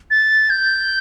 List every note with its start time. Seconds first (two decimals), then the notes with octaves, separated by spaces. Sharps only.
0.11 A6
0.50 G6